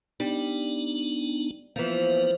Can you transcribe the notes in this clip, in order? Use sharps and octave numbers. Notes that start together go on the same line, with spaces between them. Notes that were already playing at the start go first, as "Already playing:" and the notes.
G3 B3 D4 D#4
E3 F3 A#3 B3